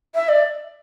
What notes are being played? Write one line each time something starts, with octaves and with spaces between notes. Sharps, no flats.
E5
D5